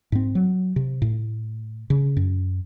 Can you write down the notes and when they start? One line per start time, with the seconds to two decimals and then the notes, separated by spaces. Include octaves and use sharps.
0.12 G#2 C4
0.35 F#3
0.76 C3
1.02 A2
1.90 C#3
2.17 F#2